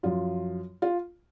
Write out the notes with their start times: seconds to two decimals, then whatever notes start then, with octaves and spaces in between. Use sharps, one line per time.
0.03 F#2 F3 F4
0.82 F4